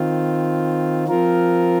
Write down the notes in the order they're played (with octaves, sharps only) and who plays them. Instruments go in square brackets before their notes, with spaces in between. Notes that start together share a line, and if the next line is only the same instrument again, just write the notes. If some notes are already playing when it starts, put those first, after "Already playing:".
Already playing: [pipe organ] D#3 C4 F4
F3 C4 F4 A#4